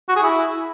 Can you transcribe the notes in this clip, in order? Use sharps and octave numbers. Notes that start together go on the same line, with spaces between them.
F#4
G#4
E4